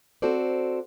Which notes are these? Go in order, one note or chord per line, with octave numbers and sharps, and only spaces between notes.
C4 F#4 A4 C5 D5